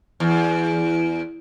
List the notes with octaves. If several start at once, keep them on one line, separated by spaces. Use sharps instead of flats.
E2